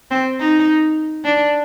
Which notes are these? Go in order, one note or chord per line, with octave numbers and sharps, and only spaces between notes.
C4
D#4
D4